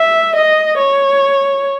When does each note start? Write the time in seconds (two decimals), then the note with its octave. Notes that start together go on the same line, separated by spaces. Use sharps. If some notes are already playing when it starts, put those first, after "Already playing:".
Already playing: E5
0.36 D#5
0.78 C#5